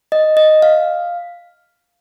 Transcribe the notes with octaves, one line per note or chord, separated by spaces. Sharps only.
D#5
D#5
F5